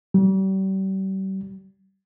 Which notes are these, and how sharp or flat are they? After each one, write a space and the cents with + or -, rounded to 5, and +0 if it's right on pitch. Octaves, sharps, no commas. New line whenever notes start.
G3 -40